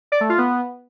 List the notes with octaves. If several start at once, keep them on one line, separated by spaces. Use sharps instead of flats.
D5
A3
F4
B3